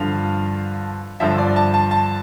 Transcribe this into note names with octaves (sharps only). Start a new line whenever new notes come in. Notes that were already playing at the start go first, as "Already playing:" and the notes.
Already playing: G2 D3 F3 F5
G2 D3 F3 E5
D5
A5
A5
A5